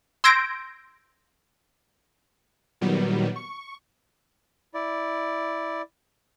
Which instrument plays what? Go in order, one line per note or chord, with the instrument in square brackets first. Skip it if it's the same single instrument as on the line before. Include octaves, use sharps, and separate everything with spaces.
[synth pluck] C6 E6 G6 G#6 A#6 D7
[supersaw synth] A#2 D#3 F#3 G3 B3
C#6
[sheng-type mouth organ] E4 D5